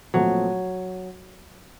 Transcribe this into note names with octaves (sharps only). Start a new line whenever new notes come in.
A#2 F3 F#3 A3 C4